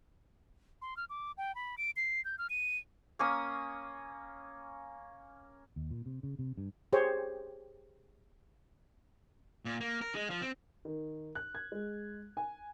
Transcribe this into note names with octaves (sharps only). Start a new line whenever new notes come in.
C6
F6
D6
G5
B5
D7
C7
G6
F6
D#7
A#3 C#4 D#6
D#2
A#2
C3
C#3
C3
G2
G4 G#4 C5 C#5
A#2
A#3
A#4
G#3
F3
C4
D#3
F#6
G#6
G#3
G#5